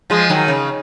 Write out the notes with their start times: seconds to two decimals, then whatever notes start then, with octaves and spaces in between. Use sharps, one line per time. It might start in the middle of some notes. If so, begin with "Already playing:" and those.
0.10 F3 G#3
0.29 D#3 F#3
0.48 C#3